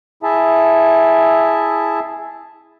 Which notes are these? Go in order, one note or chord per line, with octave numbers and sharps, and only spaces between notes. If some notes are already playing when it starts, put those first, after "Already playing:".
E4 G#4 E5 A5